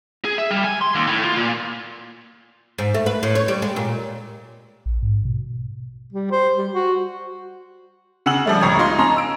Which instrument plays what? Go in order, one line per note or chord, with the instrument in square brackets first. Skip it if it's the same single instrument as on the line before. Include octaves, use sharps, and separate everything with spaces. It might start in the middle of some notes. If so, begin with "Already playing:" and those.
[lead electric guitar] G#4
E5
G3
G#5
C6
D#2
A2
F4
A#2
[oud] G#2
A3
B4
A2
C#5
G3
G#3
A#2
[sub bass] A#1
G#2
B2
[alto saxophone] G3
C5
G3
F#4
[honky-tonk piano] C#3 F#5 E6 F#7
F3 G3 A3
C#2 A2 C#5 A#5 D#6 G#6
D#4 F4 D#5 C6
C#4 A5 A#5 C6
E6 D7